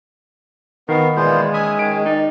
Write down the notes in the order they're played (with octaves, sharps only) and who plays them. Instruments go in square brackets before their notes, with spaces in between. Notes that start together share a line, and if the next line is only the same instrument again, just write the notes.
[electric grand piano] D#3 [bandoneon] B3 [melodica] F#4 F5 [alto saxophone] A#4
[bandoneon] A#2 E3 [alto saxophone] G#3 [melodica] B3 F4 C5
[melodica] C#4 E5 B5 [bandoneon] G#5 D#6
[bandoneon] D#3 [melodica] C#4 G#4 G#5 [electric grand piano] D7
[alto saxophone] D#4 [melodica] D5